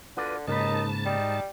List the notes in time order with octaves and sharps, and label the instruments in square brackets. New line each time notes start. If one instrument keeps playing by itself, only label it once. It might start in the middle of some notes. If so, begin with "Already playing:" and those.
[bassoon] D3 [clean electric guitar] F4 F#4 D5 [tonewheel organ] B4
[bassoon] D#2 [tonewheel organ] G#2 A5 [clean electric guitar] C#3 A#3 B4 [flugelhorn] D#4
[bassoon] G3 [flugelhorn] D#4